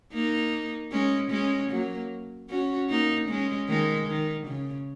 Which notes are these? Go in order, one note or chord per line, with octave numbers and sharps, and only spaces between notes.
A#3 D#4
G#3 C#4
G#3 C#4
F#3 A#3
C#4 F#4
A#3 D#4
G#3 C#4
D#3 G#3
D#3
C#3